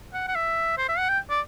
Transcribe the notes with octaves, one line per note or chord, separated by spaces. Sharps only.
F#5
F#5
E5
C5
E5
F#5
G5
D5